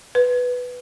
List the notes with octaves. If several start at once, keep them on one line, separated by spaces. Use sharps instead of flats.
B4